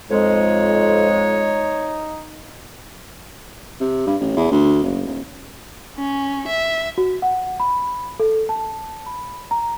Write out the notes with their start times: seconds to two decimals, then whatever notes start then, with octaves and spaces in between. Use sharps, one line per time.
0.11 F2 G#3 D#4 C#5
3.80 C3
4.07 G2
4.20 A1
4.36 E2
4.52 D2
4.83 F#1
5.06 D#1
5.97 C#4
6.48 E5
6.98 F#4
7.22 F#5
7.60 B5
8.20 A4
8.49 A5
9.06 B5
9.51 A#5